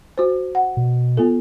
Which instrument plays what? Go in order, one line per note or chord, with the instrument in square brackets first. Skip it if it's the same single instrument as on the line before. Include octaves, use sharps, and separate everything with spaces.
[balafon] F#4 C5
F#5
[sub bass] B2
[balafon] B3 F4 A4